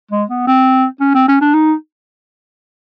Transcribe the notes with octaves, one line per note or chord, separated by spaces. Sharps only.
G#3
B3
C4
C#4
C4
C#4
D4
D#4